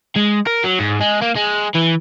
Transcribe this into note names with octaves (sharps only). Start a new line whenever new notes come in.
G#3
A#4
F#3
G#2
G#3
A#3
G#3
E3